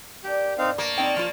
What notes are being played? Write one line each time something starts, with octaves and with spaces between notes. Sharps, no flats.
A#3 D4 G4
G2 B2 C4 D#4 C5 F5
A#3 A5 C#6
F#3 C4 D4 D#4 C#5 G5
F3 F4 G#4